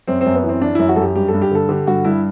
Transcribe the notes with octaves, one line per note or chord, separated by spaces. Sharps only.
F#2 C4
C4
F#2
B3
E3
C4
E3 D4
F#2 E4
F#4
F#2 A4
G4
G2 G4
A4
G2
G4
D3 A4
D3 G4
G2 F#4
G2 E4